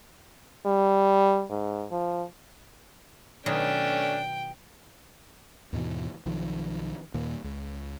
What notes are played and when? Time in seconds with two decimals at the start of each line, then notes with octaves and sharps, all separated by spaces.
0.66 G3
1.50 G#2
1.91 F3
3.46 B2 D#3 F#3 A3 C#4 D4 G5
5.73 D#2 G#2 B2 E3
6.26 B1 D#3 F3
7.14 D#2 A#2
7.44 C#2